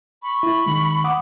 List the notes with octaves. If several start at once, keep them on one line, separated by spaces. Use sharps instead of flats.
B5 C#6
E4
D#3 G#3
F#5 D6 D#6